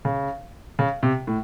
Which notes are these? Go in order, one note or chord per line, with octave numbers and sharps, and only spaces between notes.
C#3
C#3
C3
A2